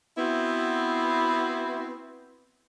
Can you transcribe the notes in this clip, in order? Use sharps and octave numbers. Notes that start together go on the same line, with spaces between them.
B3 C4 E4 F#4